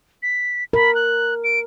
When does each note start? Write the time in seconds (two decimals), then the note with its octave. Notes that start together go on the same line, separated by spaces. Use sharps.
0.23 B6
0.73 A#4 B5
0.95 F#6
1.44 D7